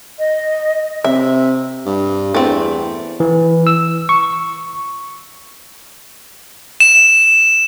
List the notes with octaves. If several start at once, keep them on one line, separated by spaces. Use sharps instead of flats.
D#5
C3 E5
G2
E2 A3 C4
E3
E6
C#6
E7